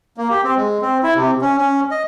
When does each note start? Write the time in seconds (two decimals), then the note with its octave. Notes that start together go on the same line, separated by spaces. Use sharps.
0.17 A#3
0.30 G4
0.44 C4
0.57 G#3
0.82 C4
1.03 E4
1.15 C3
1.41 C#4
1.58 C#4
1.91 D#5